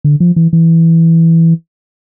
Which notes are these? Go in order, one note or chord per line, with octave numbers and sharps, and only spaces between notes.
D3
F3
E3
E3